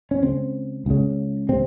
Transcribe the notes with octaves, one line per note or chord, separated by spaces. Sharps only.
C#4
C#2 C#3 C4
C#2 C#3
C3 C4